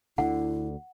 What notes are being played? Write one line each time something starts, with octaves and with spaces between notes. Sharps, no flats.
D2 D3 E4 F#5